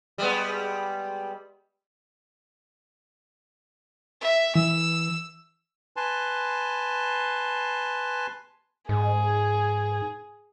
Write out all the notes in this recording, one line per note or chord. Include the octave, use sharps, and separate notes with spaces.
G3 G#3 B3
E5
E3 E6
B4 G#5 A5 C6
G#2 G#4